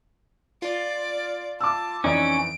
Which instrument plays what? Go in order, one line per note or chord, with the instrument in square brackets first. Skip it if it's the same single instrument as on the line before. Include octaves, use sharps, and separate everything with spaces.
[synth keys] F4 [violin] D5
[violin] A5 [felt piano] D6 E6
[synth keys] F2 E3 [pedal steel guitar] C#4 [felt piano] D#4 D5 [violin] D7